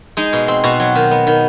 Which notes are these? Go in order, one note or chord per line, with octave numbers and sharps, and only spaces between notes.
G#3 D#4
B2
C4
B2 F#4
F#3
D#3
B3
D#3